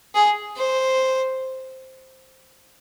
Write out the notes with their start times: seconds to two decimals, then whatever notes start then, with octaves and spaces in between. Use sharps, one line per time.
0.15 G#4
0.56 C5